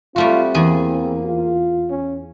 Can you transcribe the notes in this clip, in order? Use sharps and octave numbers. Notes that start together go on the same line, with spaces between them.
G3 A3 C4 F4 F#4
E2 A#3 G#4 G#5
F4
C#4